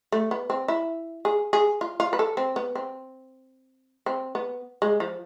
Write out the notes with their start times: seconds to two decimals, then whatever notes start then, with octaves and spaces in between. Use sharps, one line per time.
0.12 A3
0.31 B3
0.50 C4
0.68 E4
1.25 G#4
1.53 G#4
1.81 F4
2.00 F4
2.13 B4
2.19 A4
2.37 C4
2.56 B3
2.75 C4
4.06 C4
4.35 B3
4.82 G#3
5.00 F3